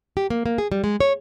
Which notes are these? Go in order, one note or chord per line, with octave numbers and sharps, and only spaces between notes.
G4
A#3
A#3
G#4
G3
G#3
C#5